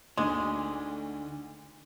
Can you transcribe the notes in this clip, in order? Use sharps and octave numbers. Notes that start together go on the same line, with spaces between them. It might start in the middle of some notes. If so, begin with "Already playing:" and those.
D2 D3 G#3 D#4 D6